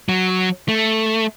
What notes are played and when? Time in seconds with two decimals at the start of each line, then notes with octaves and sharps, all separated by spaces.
0.09 F#3
0.68 A3